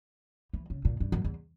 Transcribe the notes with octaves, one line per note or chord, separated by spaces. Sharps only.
E3
C#3
A#2
G2
F#2
E2